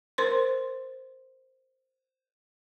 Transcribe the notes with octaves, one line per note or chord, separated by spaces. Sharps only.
A#4 C5 C6